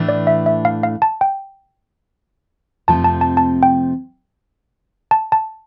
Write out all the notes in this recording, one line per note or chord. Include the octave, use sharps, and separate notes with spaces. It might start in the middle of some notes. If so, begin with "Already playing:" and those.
Already playing: A2 E3 A3 D4
D5
E5
E5
F5
F5
A5
G5
F2 C3 F3 A3 C4 A5
A5
A5
A5
G5
A5
A5